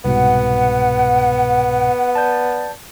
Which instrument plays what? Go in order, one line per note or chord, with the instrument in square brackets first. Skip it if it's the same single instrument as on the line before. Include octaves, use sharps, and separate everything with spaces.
[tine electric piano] C2 G#2 B2 [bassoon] B3 [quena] F#5
[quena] D5 [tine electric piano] A5 G6